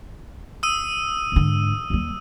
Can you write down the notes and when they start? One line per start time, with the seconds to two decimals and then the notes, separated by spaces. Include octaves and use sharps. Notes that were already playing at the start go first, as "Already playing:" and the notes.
0.63 D#6 E6 D#7
1.32 G#2 D3
1.90 D#2 G3